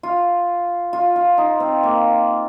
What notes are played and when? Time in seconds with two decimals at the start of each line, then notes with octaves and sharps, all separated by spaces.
0.03 F4
0.93 F4
1.16 F4
1.38 D#4
1.60 C4
1.83 A#3